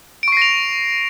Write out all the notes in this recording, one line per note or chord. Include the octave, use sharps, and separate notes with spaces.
C#6 A#6 C7 D7 F7